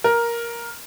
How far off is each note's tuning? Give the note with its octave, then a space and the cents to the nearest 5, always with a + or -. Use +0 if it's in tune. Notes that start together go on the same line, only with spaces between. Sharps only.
A#4 +5